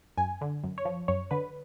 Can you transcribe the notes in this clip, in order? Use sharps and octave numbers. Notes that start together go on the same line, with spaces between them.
F#2 G#5
D3
F#2
C#5
F3
F#2 C#5
D3 B4